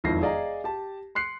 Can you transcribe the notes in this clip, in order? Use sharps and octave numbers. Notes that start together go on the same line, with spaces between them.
E1 F2 D#3 E4 A#6 C7
G#4 D5 D#5 F5 G#5 A#5
G4 A5
C6 F#6 C7 C#7